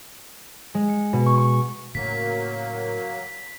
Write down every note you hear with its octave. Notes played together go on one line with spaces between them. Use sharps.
G#3
C#7
B2
C#6
C#6
A2 C#3 F#3 A#3 B6